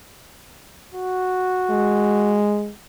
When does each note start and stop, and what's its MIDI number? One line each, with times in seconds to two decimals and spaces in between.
0.93 2.44 66
1.70 2.72 56